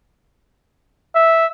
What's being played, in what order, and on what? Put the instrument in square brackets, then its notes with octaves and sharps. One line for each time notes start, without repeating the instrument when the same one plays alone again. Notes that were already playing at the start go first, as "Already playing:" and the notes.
[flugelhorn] E5